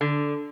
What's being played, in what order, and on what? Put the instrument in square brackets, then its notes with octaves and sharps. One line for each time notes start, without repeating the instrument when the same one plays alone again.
[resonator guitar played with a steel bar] D3